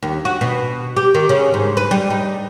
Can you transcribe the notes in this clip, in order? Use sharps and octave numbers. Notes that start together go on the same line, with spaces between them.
D#2
F#4
B2
G4
D#3
C#3
G#2
B4
G3
D#4